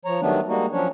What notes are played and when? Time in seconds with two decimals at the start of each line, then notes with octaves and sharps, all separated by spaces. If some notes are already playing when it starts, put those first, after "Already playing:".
0.05 F3 C#5 A#5
0.21 D#3 F#3 G3 A3 B3 D4
0.48 G3 G#3 A#3 D#4 F#4
0.73 F3 F#3 C#4 D4 C#5